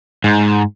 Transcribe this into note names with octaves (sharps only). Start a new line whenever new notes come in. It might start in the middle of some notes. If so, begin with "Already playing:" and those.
G#2